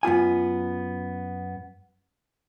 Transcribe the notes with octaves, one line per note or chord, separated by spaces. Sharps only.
F#2 B3 F4 G#5